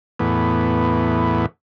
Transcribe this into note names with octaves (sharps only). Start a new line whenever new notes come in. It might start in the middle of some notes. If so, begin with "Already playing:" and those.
E2 A2 B3